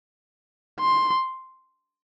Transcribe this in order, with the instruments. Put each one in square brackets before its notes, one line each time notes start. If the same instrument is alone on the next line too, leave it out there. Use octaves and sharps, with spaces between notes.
[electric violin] C6